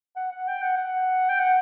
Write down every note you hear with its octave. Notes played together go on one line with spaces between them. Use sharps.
F#5
F#5
G5
F#5
F#5
G5
F#5